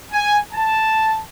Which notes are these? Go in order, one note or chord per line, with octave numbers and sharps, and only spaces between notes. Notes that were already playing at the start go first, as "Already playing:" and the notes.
G#5
A5